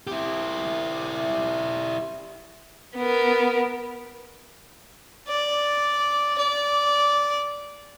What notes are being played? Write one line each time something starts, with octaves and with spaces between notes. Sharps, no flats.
E4 G4
B3 A#4
D5
D5